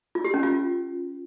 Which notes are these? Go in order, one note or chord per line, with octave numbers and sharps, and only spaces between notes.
F4
G4
C#4
F4